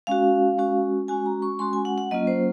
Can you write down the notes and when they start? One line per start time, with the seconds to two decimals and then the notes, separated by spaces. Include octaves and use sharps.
0.07 G#3 C#4 F#4 F5
0.58 G#3 C#4 F#4
1.08 G#3 C#4 F#4 G#5
1.26 A#5
1.42 C#6
1.59 G#3 C#4 F#4 C6
1.73 G#5
1.85 F#5
1.98 F#5
2.11 F#3 A#3 C#4 F4 D#5
2.27 C5